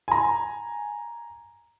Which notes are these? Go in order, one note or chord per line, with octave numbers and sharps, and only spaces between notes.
G#5 A#5